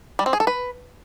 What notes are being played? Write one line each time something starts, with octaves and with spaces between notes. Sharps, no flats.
G3
C4
G#4
A4
B4